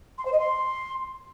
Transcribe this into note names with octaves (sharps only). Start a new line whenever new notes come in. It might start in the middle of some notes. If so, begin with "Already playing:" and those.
C6
C5
D#5
C6